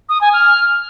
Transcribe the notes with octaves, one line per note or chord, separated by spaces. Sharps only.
D#6
G#5
F6